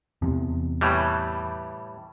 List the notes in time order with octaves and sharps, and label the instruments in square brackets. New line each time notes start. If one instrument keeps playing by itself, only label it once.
[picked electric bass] E2 C3
[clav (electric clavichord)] A2 E3 G3